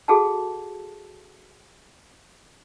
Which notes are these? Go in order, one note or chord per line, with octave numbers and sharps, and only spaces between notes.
F#4 G#4 A4 F5 F#5 A5